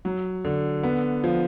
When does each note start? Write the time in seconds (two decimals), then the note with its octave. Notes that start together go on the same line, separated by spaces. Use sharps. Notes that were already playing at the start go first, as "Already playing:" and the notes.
0.05 F#3
0.45 D3
0.83 B3
1.24 F3